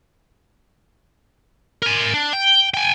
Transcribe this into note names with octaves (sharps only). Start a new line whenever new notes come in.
A#4 G#5
D4
G5
G5 G#5